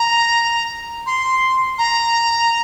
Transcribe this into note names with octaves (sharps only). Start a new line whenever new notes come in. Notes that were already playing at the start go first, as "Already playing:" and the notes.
Already playing: A#5
C6
A#5